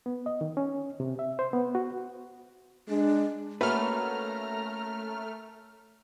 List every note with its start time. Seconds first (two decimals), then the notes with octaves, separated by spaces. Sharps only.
0.06 B3
0.26 D#5
0.41 D#3
0.57 C#4
1.00 C3
1.19 E5
1.39 C5
1.53 B3
1.75 F#4
2.89 G#3 D4
3.61 A3 A#3 C#4 F#4 B4 A#5 F6